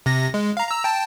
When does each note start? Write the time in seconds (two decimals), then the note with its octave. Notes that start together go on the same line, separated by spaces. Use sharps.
0.06 C3 A#6
0.34 G#3
0.57 F5 A#5
0.68 A#5 E6
0.84 G5 A5